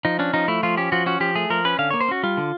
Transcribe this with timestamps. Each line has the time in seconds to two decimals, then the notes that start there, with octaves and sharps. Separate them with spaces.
0.05 F3 D#4
0.19 C#4 D4
0.34 F3 D#4
0.48 A3 E4
0.63 F3 F4
0.77 C#4 G4
0.92 F3 F#4
1.06 C#4 F#4
1.20 F3 G4
1.35 A3 G#4
1.50 F3 A#4
1.65 C#4 B4
1.79 D3 F5
1.90 A#3 C#5
2.01 C5
2.08 C#4 F#4
2.23 G3 F4
2.37 D3